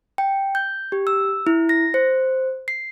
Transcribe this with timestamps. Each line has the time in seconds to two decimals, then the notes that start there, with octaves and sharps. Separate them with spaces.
0.18 G5
0.55 G6
0.92 G4
1.07 E6
1.47 E4
1.69 A#6
1.94 C5
2.68 C7